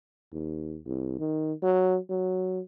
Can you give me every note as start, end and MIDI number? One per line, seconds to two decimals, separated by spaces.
0.33 0.78 39
0.86 1.16 36
1.19 1.53 51
1.63 1.98 54
2.10 2.60 54